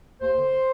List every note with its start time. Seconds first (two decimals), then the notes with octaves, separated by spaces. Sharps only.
0.21 D#2 C5
0.37 D3